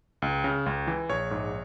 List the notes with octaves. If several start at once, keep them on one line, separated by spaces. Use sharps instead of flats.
C#2
C#3
C#2
E3
A#1 C#5
G#2